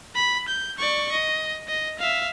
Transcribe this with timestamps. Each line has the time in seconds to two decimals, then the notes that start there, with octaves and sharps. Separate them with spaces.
0.15 B5
0.48 G6
0.78 D5 C#6
1.12 D#5
1.68 D#5
1.99 E5 F5